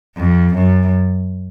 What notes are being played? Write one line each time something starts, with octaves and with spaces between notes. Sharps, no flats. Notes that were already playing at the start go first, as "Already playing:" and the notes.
F2
F#2